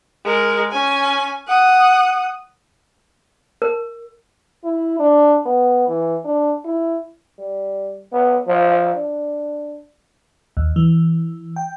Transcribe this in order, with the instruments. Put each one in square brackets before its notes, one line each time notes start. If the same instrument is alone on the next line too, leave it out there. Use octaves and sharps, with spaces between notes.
[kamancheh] G#3 A#4
C#4 G#5
F#5 D#6
[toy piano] A#4
[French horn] E4
D4
B3
E3
D4
E4
[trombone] G3
B3
F3
D4
[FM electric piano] D#2
E3
G5